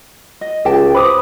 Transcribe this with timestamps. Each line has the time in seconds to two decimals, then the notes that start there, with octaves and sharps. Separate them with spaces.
0.41 D#5
0.65 C#2 G4 G5 A5
0.95 B4 C5 B5 D6 D#6